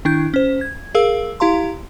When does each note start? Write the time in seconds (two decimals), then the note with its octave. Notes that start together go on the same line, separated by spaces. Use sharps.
0.05 D#3 D4 E4 G6
0.34 C#4 C5
0.61 G#6
0.95 G#4 A#4 F5 E6
1.40 E4 G4 F5 A#5 C6